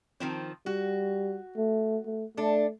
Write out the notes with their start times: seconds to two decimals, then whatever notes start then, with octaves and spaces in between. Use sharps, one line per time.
0.20 D#3 F3 C4
0.66 G3 F#4
1.57 A3
2.06 A3
2.37 A3 D4 A4